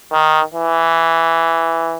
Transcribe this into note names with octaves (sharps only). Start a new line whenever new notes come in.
D#3
E3